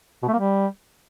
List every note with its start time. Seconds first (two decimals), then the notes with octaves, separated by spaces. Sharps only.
0.23 B2
0.28 A3
0.33 A#3
0.39 G3